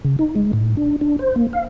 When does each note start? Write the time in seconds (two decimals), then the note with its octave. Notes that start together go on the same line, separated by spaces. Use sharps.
0.05 C#3
0.19 D#4
0.36 G#3
0.53 A2
0.77 D4
1.01 D4
1.19 C5
1.36 A#3
1.53 F5